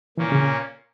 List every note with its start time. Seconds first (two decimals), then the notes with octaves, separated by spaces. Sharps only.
0.18 A#2 E3 A#3 C#4
0.32 C#3